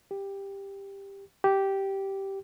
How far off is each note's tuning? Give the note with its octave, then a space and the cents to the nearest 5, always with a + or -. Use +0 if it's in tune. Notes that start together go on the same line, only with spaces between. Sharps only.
G4 +10
G4 -10